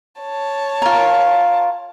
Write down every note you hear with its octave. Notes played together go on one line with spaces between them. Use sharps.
C#5 A5
F4 A#4